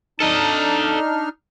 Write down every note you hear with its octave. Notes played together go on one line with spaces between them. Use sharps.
D4 D#4 A4 D#5 F6